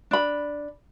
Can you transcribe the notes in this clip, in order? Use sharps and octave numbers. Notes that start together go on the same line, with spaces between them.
D4 B5